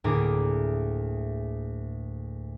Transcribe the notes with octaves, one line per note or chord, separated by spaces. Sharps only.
D2 A2 A#3 G#4 D6